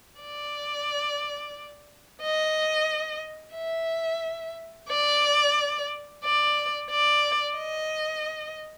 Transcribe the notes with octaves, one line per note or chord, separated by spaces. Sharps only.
D5
D#5
E5
D5
D5
D5
D#5